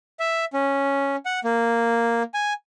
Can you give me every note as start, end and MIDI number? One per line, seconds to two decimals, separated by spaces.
0.20 0.45 76
0.53 1.16 61
1.26 1.40 78
1.44 2.23 58
2.34 2.53 80